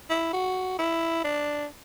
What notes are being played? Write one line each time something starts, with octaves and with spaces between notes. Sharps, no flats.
E4
F#4
E4
D4